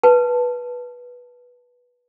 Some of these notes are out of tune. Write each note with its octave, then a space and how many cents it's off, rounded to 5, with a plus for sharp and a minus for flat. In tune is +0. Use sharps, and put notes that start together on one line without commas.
B4 -10 A5 +0